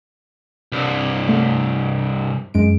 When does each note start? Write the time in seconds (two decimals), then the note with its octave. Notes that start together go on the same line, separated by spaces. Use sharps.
0.72 C2 G2
1.29 A3
2.54 F#2 G#3 D7